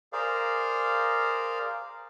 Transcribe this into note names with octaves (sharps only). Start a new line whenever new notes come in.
G#4 A#4 C5 D5 F5